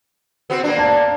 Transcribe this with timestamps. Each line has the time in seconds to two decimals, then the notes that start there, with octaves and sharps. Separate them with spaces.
0.50 B3 C4 F#4
0.64 A#3 B3 D4
0.78 A5